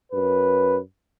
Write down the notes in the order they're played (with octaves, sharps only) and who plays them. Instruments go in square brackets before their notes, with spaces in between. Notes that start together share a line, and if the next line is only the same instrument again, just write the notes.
[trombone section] F#2 B4